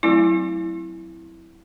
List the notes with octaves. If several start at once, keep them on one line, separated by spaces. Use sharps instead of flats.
F#3 A3 C4 E4